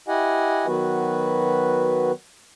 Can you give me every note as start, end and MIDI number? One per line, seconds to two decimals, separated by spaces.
0.08 0.66 64
0.08 0.66 67
0.08 0.66 75
0.08 0.66 78
0.08 0.66 80
0.67 2.12 51
0.67 2.12 54
0.67 2.12 59
0.67 2.12 66
0.67 2.12 71